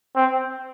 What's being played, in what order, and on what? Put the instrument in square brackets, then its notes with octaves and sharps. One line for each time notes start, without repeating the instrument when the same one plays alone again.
[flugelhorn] C4